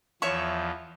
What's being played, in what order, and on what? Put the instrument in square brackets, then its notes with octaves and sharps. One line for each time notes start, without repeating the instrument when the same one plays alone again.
[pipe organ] E2 F3 [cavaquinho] C#5 E5 C#6